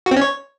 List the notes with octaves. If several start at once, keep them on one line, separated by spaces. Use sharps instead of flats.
F#4
C4
C#4
C#5